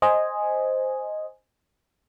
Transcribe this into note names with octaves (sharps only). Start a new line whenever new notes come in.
C5 D#5 G#5